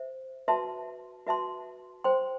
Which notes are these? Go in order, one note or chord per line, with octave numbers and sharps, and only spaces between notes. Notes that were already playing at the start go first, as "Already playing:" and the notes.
Already playing: C5 E5
F#4 B4 E5 A5 C6
F#4 B4 E5 A5 C6
C5 G5 C6